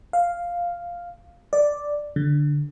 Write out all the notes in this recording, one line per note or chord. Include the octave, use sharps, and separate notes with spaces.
F5
D5
D3